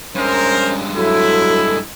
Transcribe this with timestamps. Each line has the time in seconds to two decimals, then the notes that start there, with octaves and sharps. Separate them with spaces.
0.15 G2 G#3 C#4 A#4 C5
0.95 F#3 E4 A4